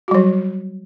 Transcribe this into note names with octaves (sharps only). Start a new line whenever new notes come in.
F#3 G3 F#4